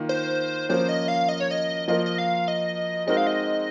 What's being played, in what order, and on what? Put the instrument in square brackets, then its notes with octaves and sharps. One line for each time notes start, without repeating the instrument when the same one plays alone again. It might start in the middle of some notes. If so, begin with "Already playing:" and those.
Already playing: [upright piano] D#3 A#3 F4
[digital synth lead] C5
[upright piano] F3 A#3 C#4 [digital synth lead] C5
[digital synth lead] D#5
F5
D#5
C#5
D#5
[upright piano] F3 A#3 F4 A#4 [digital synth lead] D#5
[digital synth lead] D#5
F5
D#5
[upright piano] G#3 C4 D#4 F#4 A#4 [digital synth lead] D#5
[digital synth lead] F5
D#5